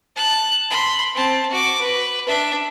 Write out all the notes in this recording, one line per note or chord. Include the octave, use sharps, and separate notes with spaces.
A5 F#6
B5 C6
C4 A5
F#4 D6
B4
D4 E5